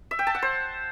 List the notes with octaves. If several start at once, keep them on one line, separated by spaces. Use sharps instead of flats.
E5
G5
A5
F#5
C5